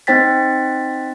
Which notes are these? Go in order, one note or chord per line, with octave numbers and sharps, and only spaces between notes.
C4 D#4 C5 G5 A6 B6